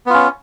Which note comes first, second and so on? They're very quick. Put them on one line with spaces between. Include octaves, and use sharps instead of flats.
B3 F4 C#4